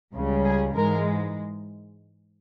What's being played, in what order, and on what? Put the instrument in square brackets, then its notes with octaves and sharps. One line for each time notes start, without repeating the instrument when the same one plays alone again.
[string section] C#2 C#3 G3
G#4
G#2 E3 G#3 A#4